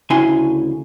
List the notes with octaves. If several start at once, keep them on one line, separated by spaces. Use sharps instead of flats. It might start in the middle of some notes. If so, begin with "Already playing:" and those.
D2 C#3 E4 G#5 C6